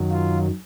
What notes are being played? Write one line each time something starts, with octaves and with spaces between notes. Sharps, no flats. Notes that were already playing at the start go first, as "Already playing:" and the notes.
Already playing: F#2 D#3 F#3
F4